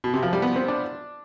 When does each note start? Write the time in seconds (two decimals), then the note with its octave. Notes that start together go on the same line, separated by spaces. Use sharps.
0.04 B2
0.14 C3
0.23 F3
0.33 G3
0.42 B3
0.56 C4
0.68 D4